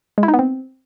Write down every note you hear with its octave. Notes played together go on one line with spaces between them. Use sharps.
G#3
E4
D#4
B3
C4